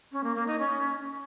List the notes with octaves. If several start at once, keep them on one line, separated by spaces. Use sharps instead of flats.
C#4
A#3
A#3
D#4
C#4